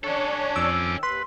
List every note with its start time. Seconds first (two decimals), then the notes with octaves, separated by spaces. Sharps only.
0.04 C#4 D4 A4 C#5
0.56 F2 D6 E6
0.81 D#3
1.03 D#2 B4 C6